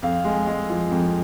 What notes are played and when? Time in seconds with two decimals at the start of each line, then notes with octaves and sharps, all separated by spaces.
0.02 F2 F5
0.25 G#3
0.47 G#3
0.70 F3
0.91 F2